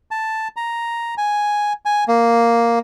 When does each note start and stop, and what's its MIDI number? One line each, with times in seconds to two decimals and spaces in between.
0.11 0.48 81
0.57 1.15 82
1.18 1.73 80
1.85 2.04 80
2.08 2.79 58